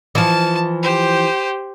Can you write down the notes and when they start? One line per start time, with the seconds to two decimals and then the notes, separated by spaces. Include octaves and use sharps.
0.15 E3 F3 A5
0.83 G4 C5